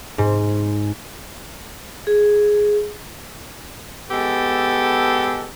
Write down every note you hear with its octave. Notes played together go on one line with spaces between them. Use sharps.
G#2
G#4
G#3 B3 G4 A4